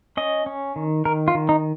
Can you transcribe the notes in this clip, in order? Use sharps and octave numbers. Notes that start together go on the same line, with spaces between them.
C#4 D#5
C#4
D#3
D#3 A#4
F4
D#3
D#4